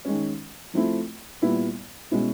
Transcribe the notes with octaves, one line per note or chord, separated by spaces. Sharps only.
D#3 G#3 C#4
F3 A3 C4 E4
A#2 G3 B3 E4
B2 G#3 C#4 E4